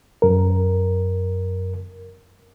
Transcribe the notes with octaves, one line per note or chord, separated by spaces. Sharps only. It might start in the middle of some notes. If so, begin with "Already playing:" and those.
F#2 A#4